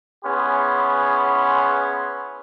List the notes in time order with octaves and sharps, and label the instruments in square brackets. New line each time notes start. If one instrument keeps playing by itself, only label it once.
[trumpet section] B3 C#4 E4 G#4 C6